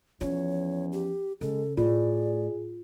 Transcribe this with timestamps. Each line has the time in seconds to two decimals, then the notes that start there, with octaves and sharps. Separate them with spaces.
0.21 E2 F3 C#4 C#5
0.92 G4
1.41 C#3 G#3 A4
1.77 A2 F4 G#4 D5